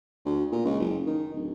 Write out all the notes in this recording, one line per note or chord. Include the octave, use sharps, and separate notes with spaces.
D2
A#2
C#2
F#1
D#3
D1